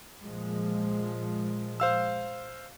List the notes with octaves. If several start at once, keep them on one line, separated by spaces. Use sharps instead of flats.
A#2 F3 G#3
C5 F5 E6